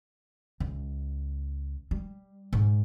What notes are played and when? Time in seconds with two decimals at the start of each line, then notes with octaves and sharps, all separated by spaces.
0.60 C#2
1.91 G3
2.53 G#2